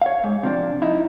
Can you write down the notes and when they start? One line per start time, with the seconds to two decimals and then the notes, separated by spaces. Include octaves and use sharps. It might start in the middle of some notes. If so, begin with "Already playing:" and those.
0.02 C#5 F5
0.24 G#2
0.43 C3 F3 D4
0.82 D#4 E4